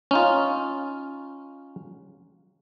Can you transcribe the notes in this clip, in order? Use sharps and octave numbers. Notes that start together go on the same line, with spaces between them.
C#4 D#4 F4